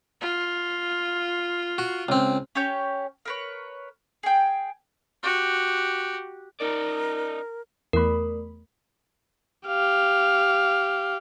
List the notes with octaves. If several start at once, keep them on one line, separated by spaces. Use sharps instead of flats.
F4
F#4
C#2 C4
C#4 G4 C#5 G6
A#4 B4 C#5
G#4 G5
F#4 G4
D#4 A#4 D5
E2 A3 A#4 B5
G4 F5